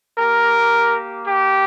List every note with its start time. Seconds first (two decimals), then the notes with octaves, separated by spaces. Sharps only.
0.17 A#3 G4 A#4
1.27 G4